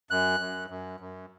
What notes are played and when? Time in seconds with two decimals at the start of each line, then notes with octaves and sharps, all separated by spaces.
0.10 F#2 F#6
0.40 F#2
0.70 F#2
1.00 F#2